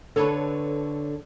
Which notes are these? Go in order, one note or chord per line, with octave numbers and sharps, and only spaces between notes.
D3 A4 B4 C#5